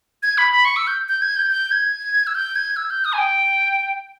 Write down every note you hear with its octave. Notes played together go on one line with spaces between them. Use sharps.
G#6
B5
B5
C#6
E6
G6
G6
G#6
G6
G6
G#6
E6
G6
G#6
E6
G6
D#6
G#5
G5